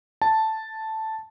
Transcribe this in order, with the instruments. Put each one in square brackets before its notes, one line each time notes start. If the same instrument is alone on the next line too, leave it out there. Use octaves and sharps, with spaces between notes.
[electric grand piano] A5